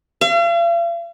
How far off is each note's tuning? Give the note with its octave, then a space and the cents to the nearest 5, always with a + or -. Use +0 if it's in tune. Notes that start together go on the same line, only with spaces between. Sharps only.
F5 -45